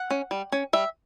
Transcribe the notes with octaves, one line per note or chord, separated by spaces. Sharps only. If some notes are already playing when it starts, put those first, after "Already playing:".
Already playing: F#5
C#4
G3
C#4
G3 E5